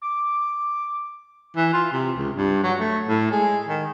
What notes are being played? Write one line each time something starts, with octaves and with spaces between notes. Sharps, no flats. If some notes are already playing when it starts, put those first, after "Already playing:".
D6
E3
F4
C3
C#2
G2
F#3
A3
A2
G#3
D#3